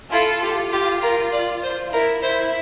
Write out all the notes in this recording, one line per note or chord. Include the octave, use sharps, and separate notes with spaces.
E4 F4 A4
F4 G4
G4
A#4
D5
C5
E4 A#4
E4 C5